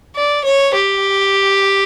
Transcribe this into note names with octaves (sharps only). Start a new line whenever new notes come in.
D5
C#5
G4